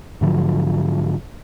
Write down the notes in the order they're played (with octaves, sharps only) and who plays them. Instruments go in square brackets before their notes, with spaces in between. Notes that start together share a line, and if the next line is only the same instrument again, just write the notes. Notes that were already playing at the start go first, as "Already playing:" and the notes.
[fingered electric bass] G#2 D3 F3 F#3